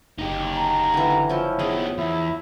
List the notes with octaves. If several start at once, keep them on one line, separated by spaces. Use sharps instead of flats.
F#1 D#4 G4
A#5
D3 E3
F3 C#4 E4
D#3 B3 G#4
E2 E4